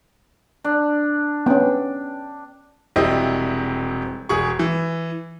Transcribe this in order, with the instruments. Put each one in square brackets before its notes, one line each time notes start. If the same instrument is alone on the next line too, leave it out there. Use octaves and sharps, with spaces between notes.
[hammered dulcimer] D4
[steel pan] B3 C#4 [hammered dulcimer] G5
[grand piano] E1 C3 G3 C4 E4 D#5
E1 G#4 C#6
E3